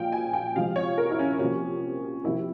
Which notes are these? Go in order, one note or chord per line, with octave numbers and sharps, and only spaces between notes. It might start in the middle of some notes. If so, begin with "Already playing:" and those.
Already playing: A#2 F3 G#3 F5 G5
G#5
G5
C3 F3 G#3 F5
C#5
A#4
E4
C#4
C3 F3 A#3 C#4
C3 F3 A#3 E4